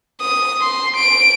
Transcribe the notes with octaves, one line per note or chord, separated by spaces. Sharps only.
D#6
C6
D7